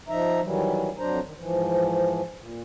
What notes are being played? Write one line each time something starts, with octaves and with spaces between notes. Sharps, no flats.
F3 D#4 E5 A#5
D#3 E3 F#3 G3
F2 F#3 D4 C5 A#5
D#3
G#2 E3 F3
A#2